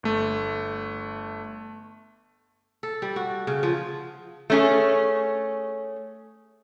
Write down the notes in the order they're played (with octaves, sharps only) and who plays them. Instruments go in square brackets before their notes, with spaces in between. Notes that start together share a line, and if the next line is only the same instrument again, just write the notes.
[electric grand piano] G1 A3
[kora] A4
G3
F#4
C#3
F3
[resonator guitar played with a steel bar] A3 C#4 G#4